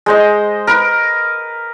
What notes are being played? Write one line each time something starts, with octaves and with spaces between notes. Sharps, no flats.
G#3 C5 D#5
A#4 B4